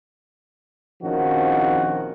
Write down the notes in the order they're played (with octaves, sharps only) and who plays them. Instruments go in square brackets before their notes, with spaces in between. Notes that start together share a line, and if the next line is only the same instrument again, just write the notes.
[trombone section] A#1 D#3 F3 C4 C#4 F#4